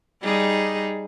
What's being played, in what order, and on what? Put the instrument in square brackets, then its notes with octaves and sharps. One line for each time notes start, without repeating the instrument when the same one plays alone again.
[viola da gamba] G3 D#4 G#4